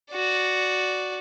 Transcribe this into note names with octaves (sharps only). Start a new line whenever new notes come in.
F#4 D5